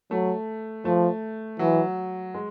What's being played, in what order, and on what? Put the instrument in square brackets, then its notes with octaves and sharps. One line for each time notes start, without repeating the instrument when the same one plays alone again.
[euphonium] F#3 [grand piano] A3
[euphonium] F3 [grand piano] A3
[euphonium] E3 [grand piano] F#3
[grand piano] G#3